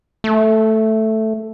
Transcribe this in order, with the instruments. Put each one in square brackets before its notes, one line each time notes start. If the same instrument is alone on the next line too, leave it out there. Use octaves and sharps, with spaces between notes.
[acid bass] A3